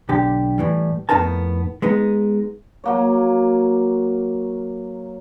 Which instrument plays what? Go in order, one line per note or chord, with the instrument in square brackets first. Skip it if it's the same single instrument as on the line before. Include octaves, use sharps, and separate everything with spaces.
[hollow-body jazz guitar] B1 D3 G4
A2 E3 G3
F2 A2 B3 D#4 A#4 A5
G#3 B3 D#4
[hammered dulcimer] F#3 A#3 C#5